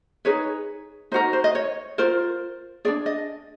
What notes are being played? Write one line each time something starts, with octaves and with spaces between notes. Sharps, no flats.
D#4 G#4 B4 C#5
D#4 F#4 A#4 C5
C5
D#5
C#5
F4 A#4 C5
D4 F4 G#4 D5
D#5